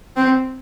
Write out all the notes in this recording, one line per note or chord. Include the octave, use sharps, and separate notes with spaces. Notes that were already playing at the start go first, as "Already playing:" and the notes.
C4